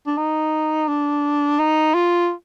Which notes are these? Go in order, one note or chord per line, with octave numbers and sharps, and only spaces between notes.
D4
D#4
D4
D#4
F4